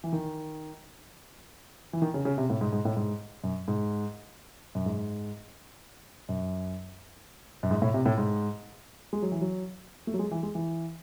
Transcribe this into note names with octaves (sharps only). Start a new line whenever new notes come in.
E3
D#3
E3
D#3
C#3
C#3
C3
A2
G#2
G#2
A2
G#2
F#2
G#2
F#2
G#2
F#2
F#2
G#2
A2
C3
A2
G#2
G#3
F#3
E3
F#3
A3
F#3
G#3
E3
G#3
E3